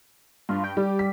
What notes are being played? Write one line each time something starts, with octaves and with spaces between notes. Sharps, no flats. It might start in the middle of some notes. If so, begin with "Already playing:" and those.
G2 F4
G5
G3 G4
B6